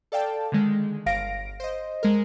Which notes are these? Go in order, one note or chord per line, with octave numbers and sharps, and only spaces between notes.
A4 D5 F5 G5 A5
D3 D#3 G#3
G1 F5 A#6 D7
C5 D#5
G#3 A#4